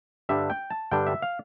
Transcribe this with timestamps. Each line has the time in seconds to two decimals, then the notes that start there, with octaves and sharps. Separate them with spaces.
0.29 G2 D3 G3 D4 E5
0.50 G5
0.71 A5
0.91 G2 D3 G3 D4 G5
1.07 E5
1.22 F5